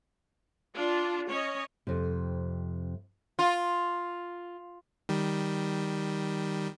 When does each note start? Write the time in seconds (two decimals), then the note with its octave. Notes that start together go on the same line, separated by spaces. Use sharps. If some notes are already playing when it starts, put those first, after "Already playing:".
0.75 D4 F4
1.28 C#4 C#5 D#5
1.87 F2 C3
3.39 F4
5.09 D#3 G3